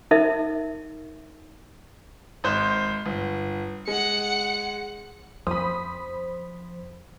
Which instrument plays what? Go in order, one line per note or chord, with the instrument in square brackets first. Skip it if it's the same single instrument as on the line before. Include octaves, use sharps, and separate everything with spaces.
[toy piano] D#4 A#4 E5
[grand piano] G#1 C5 F#6
G1
[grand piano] G#3 [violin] F#5 C#7
[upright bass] F2 [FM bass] F3 [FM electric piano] C5 [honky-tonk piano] B5 D#6